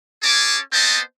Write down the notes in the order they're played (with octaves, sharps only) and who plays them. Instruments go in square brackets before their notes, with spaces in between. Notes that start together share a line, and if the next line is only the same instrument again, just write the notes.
[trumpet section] C#4 G#4 A5 D6
B3 C4 C5 D#5 A5